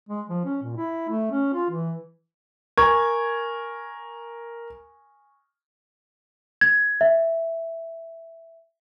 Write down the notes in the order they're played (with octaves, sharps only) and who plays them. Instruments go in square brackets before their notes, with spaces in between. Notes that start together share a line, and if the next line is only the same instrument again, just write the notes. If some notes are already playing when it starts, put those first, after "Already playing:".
[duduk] G#3
F3
C#4
A#2
E4
A3
C#4
F4
E3
[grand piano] A#4 G#6 [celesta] G#5 C#6
[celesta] G#6
E5